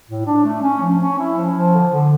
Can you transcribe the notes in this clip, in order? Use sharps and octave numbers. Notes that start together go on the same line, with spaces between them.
A2
D4
A3
C#4
F3
C#4
E4
F3
F3
D3
D3